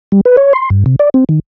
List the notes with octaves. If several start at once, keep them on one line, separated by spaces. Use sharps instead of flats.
G3
B4
C#5
C6
G2
C3
D5
C4
D#3